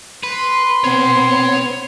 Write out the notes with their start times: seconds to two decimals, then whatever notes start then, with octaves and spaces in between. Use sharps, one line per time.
0.23 B4 C6
0.84 B3 C4 C#5 B5